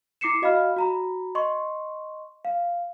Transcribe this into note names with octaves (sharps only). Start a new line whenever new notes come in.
E4 D6 C7 C#7 E7
F#4 D#5 F5 B5 F6
F#4 A#5 B5
D#5 C6 C#6
F5